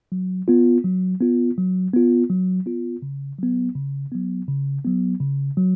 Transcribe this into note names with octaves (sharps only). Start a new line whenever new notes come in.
F#3
B3 F4
F#3
B3 F4
F#3
B3 F4
F#3
B3 F4
C#3
F#3 B3
C#3
F#3 B3
C#3
F#3 B3
C#3
F#3